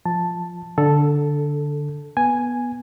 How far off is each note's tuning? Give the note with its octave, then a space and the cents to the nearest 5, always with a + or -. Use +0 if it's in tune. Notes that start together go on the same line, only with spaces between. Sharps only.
F3 +0 A5 +0
D3 +0 A4 +0
B3 -15 G#5 +0